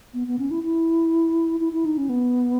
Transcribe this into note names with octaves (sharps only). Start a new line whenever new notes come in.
B3
B3
C#4
E4
E4
E4
E4
D#4
C#4
B3